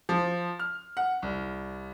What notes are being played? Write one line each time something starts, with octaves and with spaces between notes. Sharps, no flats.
F3
F6
F#5
C2